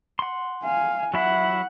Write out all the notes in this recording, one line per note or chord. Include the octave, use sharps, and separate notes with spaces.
F#5 C6
F5 G#5
F#3 E4 E5 F#5